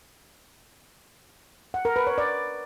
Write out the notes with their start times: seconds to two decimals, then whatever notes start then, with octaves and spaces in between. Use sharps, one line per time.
1.74 F#5
1.85 A#4
1.96 B4
2.07 C#5
2.18 D5